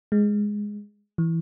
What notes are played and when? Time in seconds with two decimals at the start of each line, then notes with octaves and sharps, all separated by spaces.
0.12 G#3
1.18 E3